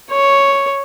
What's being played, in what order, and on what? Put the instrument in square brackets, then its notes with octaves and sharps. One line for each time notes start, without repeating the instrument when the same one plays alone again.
[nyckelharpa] C#5